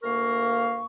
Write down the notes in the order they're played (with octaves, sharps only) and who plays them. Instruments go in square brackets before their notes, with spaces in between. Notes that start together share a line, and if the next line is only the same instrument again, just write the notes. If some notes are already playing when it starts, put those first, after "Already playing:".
[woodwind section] D2 A#3 A#4 F5 C#6